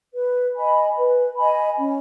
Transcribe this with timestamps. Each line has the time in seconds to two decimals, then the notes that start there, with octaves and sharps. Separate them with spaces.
0.14 B4
0.56 D#5 G#5 B5
0.96 B4
1.37 D#5 G#5 B5
1.78 C#4